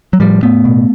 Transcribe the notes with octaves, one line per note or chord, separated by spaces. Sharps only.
F#3
A2 F3 G3
A2 A3 B3
B2